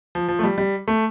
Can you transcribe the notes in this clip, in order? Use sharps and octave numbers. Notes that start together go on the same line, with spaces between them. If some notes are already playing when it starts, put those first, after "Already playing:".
F3
F3
A3
G3
G3
A3